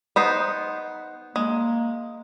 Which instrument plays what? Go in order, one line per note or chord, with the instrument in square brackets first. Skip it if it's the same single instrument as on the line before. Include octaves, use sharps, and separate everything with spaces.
[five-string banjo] B3 D#4 C5
[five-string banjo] G#3 [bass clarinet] A#3